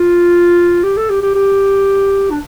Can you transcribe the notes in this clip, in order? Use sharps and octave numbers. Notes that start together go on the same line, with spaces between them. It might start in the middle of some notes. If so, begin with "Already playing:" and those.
Already playing: F4
G4
A4
G4
G4
G4
D4